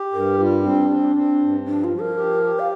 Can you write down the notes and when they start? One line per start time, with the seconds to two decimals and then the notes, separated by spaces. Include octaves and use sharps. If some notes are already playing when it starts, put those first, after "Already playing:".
Already playing: G4
0.13 G2 A#4
0.40 G3 F4
0.64 C4 D4
0.90 C4
1.15 C4
1.40 G2
1.66 F3 D4
1.84 F4
1.92 F3
2.01 A#4
2.17 G4
2.43 G4
2.59 F5